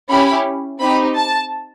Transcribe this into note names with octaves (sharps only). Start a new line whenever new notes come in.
C#4 E4 G4 B5
C4 D#4 G4 B5
A5